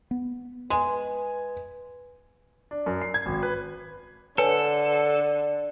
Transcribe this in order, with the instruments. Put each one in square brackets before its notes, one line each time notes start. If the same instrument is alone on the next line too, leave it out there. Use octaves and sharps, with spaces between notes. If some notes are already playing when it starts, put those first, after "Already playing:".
[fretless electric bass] B3
[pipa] G#3 [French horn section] B4 [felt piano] G#5
[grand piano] D4
F#2
C7
G#6
G#1
B4
[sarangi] D3 [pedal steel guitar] A4 [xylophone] B4 C#5 G#5